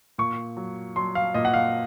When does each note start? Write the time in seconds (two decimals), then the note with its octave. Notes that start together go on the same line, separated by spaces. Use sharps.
0.18 A#2 C#6
0.57 F#3
0.96 F#3 C6
1.15 F5
1.34 A#2 D#5
1.45 F#5
1.54 F5